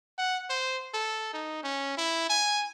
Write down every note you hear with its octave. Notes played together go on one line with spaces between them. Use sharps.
F#5
C5
A4
D#4
C#4
E4
G#5